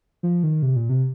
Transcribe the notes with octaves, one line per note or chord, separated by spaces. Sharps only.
F3
D#3
C3
A#2
C3